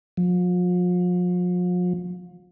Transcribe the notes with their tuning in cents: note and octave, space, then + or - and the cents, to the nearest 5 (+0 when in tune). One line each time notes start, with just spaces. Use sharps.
F3 +40